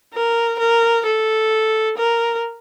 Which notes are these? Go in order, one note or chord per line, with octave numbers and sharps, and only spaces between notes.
A#4
A#4
A4
A#4